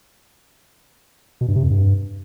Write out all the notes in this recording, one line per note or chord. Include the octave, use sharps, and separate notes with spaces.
B2
G2
C3
F2
G2